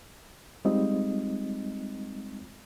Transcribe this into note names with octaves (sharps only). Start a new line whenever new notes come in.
G3 G#3 C4 D#4 F4 D#5